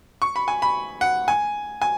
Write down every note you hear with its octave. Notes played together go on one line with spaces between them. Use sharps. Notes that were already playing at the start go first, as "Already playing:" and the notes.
C#6
B5
G#5
B5
F#5
G#5
G#5